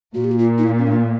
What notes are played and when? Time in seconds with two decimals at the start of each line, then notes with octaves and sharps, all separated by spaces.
0.14 A#2 F#4
0.24 G4
0.31 F#4
0.38 F4
0.58 D#4
0.63 E4
0.78 C#4
0.87 D4